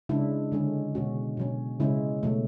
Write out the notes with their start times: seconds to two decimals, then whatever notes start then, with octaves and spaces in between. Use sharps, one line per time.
0.09 C#3 G#3 D4 E4
0.52 D3 G#3 C#4
0.95 B2 G#3 C#4 F#4
1.37 B2 F#3 C#4
1.80 C#3 G#3 C#4 E4
2.23 B2 F#3 A3